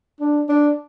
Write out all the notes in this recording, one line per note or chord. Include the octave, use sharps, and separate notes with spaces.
D4
D4